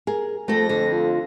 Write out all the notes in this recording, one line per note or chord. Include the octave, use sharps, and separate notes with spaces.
G#4 A#4
F2 A3 A4 A#6
D3
F4